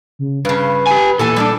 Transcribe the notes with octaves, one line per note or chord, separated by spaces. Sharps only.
C#3
G2 C#3 B4
G4 G#5
E2 A#2 E3 A4 G#5
G3 A3 D4